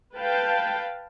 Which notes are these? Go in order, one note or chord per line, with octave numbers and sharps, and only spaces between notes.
B4 F5 G5 A5